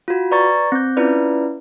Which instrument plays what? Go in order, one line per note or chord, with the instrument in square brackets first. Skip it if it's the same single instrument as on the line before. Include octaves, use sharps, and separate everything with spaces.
[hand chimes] F4 F#4
B4 D5 A#5 C#6 A6
C4 G6
C#4 E4 F4 B4 D5